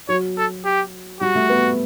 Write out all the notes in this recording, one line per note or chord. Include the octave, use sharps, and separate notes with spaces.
F#3 C#5
A4
G4
G3 F#4
A3
B3